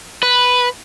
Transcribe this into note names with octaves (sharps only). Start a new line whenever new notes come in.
B4